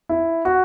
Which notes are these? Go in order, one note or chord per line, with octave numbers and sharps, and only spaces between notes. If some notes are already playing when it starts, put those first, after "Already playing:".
E4
F#4